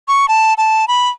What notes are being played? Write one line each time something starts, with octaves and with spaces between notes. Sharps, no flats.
C#6
A5
A5
B5